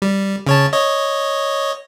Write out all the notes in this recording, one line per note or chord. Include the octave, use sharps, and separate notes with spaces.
G3
C#3 C#5 A5
C#5 D#5